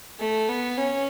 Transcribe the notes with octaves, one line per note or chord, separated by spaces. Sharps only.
A3
B3
C#4